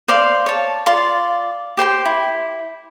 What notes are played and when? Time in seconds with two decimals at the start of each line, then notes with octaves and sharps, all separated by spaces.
0.08 C5 D5 F5 C6
0.46 C#5 A5
0.86 F4 D5 C6
1.77 G4 C5 G5 C6
2.05 E4